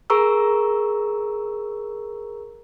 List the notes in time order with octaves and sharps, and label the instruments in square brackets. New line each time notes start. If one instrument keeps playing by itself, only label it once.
[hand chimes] G#4 A#4 A#5 C#6 E6